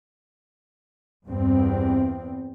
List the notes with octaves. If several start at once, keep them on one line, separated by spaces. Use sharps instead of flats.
E2 G2 C4